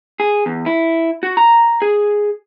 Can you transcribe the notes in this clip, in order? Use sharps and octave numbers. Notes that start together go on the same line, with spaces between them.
G#4
E2
E4
F#4
A#5
G#4